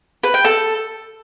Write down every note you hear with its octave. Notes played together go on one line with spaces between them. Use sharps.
B4
G5
A4